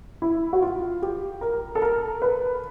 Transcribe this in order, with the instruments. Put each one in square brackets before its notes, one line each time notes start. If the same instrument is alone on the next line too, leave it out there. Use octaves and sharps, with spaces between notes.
[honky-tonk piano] E4
F#4
F4
G4
A#4
A4
A#4
B4